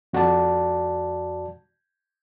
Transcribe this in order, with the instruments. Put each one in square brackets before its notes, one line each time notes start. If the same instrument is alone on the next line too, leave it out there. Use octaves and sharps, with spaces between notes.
[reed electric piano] F2 F#4 D5 A5